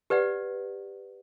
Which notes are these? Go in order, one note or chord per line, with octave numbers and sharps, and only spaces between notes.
G4 B4 D5 F#5